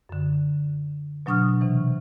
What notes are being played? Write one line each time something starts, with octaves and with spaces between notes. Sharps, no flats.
F#2 D3
B2 F#3 D4 C#6 D#6 F6
C3 E3